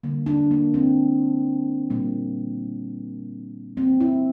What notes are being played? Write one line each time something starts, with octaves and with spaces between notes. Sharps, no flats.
D3 G3 A#3
D4
A#3
C4
A#2 G3 A#3
E3 A#3 C4
E4